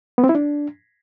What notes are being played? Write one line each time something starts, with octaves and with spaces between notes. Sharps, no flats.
B3
C4
E4
D4